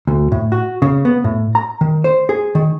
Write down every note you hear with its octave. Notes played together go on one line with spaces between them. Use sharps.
D2
A2
F#4
C#3
B3
A2
A#5
D#3
C5
G#4
D#3